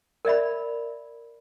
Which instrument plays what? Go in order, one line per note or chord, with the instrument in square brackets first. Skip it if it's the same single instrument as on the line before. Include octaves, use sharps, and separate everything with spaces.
[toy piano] A#4 D5 E5 B5